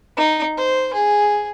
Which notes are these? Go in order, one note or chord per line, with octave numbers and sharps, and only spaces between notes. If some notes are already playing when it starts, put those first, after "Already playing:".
D#4
C5
G#4